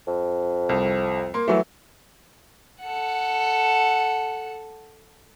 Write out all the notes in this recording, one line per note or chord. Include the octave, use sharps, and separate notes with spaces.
F2
C2
A#3 C6
E3 F#3 A3
A4 F#5